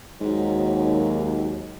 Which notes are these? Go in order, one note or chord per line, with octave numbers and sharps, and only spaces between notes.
D#2 G#2 F#3